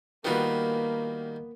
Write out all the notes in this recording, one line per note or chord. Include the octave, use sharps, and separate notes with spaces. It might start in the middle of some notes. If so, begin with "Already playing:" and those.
D#3 G3 A#3 B3 F4 F#4 B4